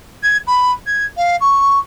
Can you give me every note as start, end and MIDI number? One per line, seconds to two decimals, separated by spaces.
0.23 0.37 92
0.47 0.71 83
0.86 1.05 92
1.16 1.36 77
1.40 1.79 85